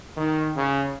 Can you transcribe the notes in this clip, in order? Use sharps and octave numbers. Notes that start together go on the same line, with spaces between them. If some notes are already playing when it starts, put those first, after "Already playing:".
D#3
C#3